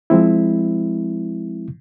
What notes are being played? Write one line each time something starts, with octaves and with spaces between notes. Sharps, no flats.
F3 G#3 C4 E4